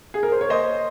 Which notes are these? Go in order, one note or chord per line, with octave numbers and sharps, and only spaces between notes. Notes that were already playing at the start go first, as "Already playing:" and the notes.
G#4
A#4
C5
C#5
A#3 C5 D#5